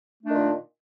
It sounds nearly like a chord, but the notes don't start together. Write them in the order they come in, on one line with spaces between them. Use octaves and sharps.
A3 D4 D#3 A#2